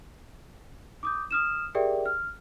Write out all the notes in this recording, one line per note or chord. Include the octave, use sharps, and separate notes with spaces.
D6 D#6 G6
D#6 F6 E7
G4 G#4 A#4 D5 E5 G5
F6